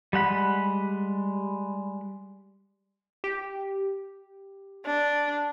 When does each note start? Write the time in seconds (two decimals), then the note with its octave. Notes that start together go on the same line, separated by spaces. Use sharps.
0.13 G3 G#3 F#5 B5
3.24 G4
4.87 D4